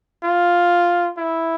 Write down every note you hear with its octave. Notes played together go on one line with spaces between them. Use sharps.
F4
E4